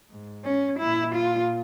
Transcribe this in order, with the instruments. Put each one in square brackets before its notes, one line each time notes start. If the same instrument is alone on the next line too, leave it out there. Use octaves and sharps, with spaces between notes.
[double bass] G#2
[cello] C#4
[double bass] A#2 [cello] E4
[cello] F4